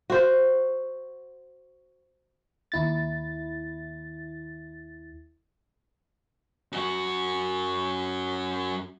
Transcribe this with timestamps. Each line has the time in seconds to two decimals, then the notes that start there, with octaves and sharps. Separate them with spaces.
0.10 F#4 C5
2.72 D#2 E4 A6
6.72 F#2 F#4